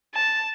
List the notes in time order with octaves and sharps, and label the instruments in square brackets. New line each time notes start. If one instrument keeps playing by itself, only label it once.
[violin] A5